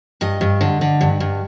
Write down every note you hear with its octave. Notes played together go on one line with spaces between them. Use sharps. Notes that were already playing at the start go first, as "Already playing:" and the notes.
G2 D#5
G2
D3
D3
G2
G2